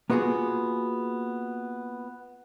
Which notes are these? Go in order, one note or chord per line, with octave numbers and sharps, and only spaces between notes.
A#3 B3 F4 F#4 G#4